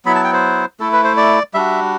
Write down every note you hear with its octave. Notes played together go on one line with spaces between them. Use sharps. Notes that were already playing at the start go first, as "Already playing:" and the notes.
F#3 B3 E4 B5
A5
G5
C5
A3 E4 A4
B4
C5
D5
G3 D4 F#4 E5